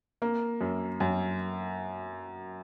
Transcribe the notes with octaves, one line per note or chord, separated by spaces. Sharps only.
A#3
F#2
F#2